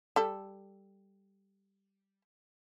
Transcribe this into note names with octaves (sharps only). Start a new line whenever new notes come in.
G3 A4